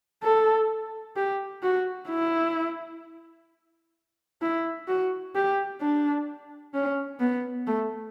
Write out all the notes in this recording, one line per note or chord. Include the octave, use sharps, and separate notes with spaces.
A4
G4
F#4
E4
E4
F#4
G4
D4
C#4
B3
A3